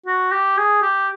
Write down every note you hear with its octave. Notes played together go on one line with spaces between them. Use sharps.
F#4
G4
G#4
G4